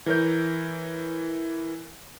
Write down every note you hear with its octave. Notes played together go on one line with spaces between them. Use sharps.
E3 A#4 C#5 G6